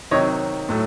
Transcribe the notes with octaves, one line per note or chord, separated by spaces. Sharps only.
C3 D#3 F#3 C#5 D#5
A2 F#3 A3